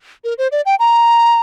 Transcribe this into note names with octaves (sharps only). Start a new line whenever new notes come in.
A#4
C5
D5
G5
A#5